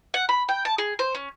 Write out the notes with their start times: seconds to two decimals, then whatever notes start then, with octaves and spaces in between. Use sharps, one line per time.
0.14 F#5
0.29 B5
0.49 G5
0.65 A5
0.78 G#4
0.99 C5
1.15 C#4